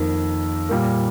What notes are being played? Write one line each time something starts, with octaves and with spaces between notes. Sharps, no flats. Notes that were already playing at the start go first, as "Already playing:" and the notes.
Already playing: F2 D#3 A#3
A#2 G3 A#3